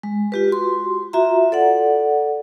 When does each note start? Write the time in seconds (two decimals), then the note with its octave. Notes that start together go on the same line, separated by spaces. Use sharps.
0.03 G#3
0.32 F4 G4 B4
0.48 F#4 C6
1.13 F4 F#4 E5 A#5
1.52 A4 D5 F#5